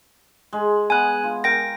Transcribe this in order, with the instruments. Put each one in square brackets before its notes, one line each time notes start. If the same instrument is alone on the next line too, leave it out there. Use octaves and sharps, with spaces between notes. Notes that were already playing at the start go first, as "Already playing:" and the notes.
[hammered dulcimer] G#3
[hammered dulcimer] B3 [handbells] G#5 F#6
[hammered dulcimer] F4
[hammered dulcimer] A#4 [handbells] G5 A#6